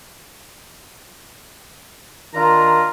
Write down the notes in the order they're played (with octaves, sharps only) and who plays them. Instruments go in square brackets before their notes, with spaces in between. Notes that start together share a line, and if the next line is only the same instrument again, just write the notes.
[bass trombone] D#3 [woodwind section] D4 A#5 [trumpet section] F4